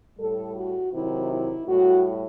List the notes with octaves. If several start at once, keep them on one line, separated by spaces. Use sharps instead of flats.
A2 G3 A4
F#4
C3 D#3 F#3 E4
E4
A2 G3 F#4